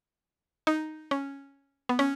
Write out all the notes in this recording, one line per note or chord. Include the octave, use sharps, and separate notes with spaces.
D#4
C#4
B3
C#4